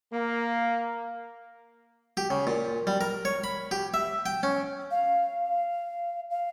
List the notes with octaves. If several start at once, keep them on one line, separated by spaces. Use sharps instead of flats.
A#3
G4
C#3
A#2
G3
A#4
C#5
B5
G4
E5
G5
C#4
F5
F5